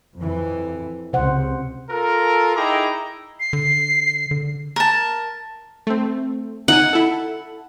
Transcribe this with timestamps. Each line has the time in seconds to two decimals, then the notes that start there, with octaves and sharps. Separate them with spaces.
0.17 F2 E3
1.13 C#2 C3 C5 F#5
1.91 F4 A4 A#4
2.56 D#4 E4 G#4 G5 A#5 D6
3.40 C7
3.53 D3
4.31 D3
4.76 A#4 A5
5.87 A3 C4
6.68 D#4 F#5 G#5
6.93 E4 A4